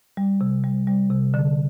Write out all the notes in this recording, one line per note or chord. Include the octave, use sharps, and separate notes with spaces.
G3
C3
G3
G3
C3
D3